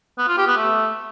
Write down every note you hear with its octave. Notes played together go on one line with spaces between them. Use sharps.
B3
F4
G4
B3
A3